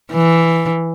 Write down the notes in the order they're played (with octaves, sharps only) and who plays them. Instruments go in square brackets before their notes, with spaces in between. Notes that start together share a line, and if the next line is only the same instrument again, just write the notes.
[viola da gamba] E3